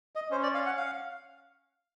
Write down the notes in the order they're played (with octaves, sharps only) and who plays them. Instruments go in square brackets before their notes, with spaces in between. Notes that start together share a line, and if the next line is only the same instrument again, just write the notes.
[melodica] D#5
[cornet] C#4 [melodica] C5
[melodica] D5
F5
F#5
F5